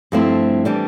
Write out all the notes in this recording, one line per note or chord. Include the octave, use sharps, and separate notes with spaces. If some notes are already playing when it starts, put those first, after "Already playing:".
G2 F3 A3 C4 E4
E3 G3 D4